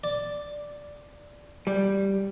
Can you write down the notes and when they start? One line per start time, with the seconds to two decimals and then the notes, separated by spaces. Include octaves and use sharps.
0.04 D5
1.67 G3